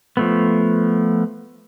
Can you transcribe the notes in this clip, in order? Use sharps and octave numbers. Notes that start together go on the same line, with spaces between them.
F3 A3 B3